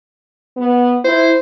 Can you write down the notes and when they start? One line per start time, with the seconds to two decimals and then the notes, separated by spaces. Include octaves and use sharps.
0.57 B3
1.04 E4 C5